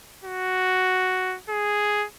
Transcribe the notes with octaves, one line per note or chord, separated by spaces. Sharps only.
F#4
G#4